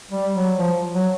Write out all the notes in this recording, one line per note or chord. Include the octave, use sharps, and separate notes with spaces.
G3
F#3
F3
F#3